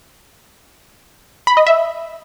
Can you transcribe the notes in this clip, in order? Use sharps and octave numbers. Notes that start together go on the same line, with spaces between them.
B5
D#5
E5